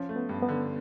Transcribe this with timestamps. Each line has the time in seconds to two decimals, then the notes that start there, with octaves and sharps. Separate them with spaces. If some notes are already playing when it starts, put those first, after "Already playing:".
Already playing: F3 C#4
0.09 A3
0.16 B3
0.29 G2
0.42 B3
0.49 D3